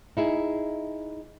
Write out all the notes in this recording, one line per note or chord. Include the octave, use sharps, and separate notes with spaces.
D#4 E4 G#4